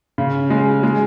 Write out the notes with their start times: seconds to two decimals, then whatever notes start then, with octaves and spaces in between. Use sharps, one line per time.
0.18 C#3
0.50 G#3
0.83 G#3